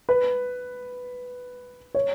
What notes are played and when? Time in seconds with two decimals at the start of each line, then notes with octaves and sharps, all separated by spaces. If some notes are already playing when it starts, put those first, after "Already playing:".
0.09 B4
1.95 C#5